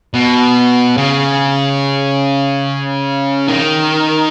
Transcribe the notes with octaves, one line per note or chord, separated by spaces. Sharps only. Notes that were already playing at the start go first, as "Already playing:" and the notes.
B2
C#3
D#3